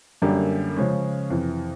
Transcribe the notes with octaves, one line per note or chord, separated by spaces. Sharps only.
F#2 D3 G3 A#3
C#3 F3 G#3 C#4
F2 C3 E3